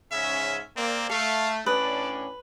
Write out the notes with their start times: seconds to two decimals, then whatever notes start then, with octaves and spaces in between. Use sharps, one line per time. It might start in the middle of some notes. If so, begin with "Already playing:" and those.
0.12 G#2 C#3 C#4 E5
0.77 A#3 C4 D5
1.10 A3 A4 F5
1.66 A2 C#4 D4 B4 D5 D#6